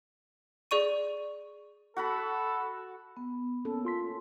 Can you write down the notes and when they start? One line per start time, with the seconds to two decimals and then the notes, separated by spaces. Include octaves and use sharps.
0.71 G#4 D5 C#6 D#7
1.96 F#4 A4 F#5 B5
3.17 B3
3.65 A#3 C#4 A4
3.85 F4 C6 B6